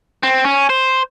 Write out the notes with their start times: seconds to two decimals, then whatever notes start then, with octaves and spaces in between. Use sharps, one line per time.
0.23 C4
0.45 C#4
0.70 C5